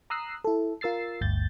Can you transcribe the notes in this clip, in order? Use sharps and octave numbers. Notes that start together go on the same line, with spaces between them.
A#5 D#6 E6 F#6 C7
E4 A4
F4 A#4 E6 A6 C7
G1 D2 G6 A6